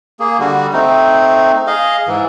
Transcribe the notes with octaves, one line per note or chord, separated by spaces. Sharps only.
A#3 G#4
D3 G3 F#4
A3 C4 D#4
G#4 D#5 F5
G#2 E3